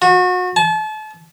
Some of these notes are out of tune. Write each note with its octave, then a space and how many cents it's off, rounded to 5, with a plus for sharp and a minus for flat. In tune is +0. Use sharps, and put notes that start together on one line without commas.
F#4 -30
A5 -35